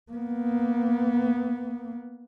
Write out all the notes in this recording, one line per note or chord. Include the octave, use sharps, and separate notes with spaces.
A#3 B3